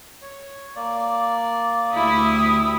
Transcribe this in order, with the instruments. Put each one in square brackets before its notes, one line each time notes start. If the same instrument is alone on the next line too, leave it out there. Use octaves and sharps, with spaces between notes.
[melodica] C#5
A#3 D5
[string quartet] D2 G4 D#6 [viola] E4 E5